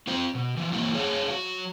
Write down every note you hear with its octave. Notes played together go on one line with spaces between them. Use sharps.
C4 F4 C5
B2
E3 F3
E3 A#3 E4 F#4
G#4 C#5 F5 A5
F#3 F#4